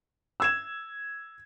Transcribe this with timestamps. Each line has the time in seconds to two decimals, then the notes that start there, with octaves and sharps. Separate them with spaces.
0.40 E6 G#6 E7